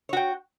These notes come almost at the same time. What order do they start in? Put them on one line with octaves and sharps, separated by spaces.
C#5 F#4 G5